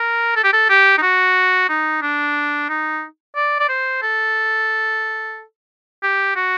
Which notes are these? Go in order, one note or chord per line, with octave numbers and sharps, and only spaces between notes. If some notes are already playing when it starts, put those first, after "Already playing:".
Already playing: A#4
A4
G4
A4
G4
D#4
F#4
D#4
D4
D#4
D5
D5
C5
A4
G4
F#4